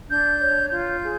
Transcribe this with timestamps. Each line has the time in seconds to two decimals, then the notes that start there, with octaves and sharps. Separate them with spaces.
0.09 D4 G6
0.40 C#5
0.70 F4 G6
1.01 G#4